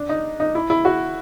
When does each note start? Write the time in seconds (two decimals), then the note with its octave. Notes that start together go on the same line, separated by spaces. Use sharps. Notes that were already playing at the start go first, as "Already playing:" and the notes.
Already playing: D4
0.09 D#4
0.40 D#4
0.55 E4
0.70 E4
0.85 F#4